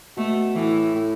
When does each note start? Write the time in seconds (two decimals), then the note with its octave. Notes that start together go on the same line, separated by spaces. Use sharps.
0.17 B2 A3
0.55 A2 E3
0.95 A2